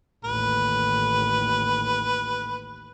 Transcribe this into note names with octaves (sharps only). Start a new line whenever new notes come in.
A1 D#2 B4